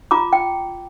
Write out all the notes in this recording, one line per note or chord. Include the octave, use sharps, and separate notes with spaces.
F4 A#5 D6
G5